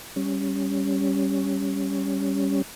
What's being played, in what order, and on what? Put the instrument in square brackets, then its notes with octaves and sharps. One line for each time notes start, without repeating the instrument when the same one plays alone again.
[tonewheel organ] G3 C#4